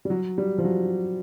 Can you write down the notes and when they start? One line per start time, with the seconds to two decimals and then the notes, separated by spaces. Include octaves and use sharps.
0.05 G3
0.10 F#3
0.38 G3
0.58 F3
0.64 F#3